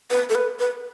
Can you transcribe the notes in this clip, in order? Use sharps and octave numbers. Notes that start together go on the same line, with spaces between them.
B4
A4
B4
B4